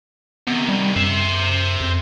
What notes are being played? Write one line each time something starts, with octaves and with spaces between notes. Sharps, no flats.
C3 D#3 B3
G3
F#2 C5 E5
F2